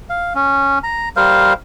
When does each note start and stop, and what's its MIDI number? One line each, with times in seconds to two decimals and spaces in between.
0.10 0.33 77
0.35 0.79 61
0.83 1.09 82
1.16 1.53 55
1.16 1.53 70
1.16 1.53 72
1.16 1.53 77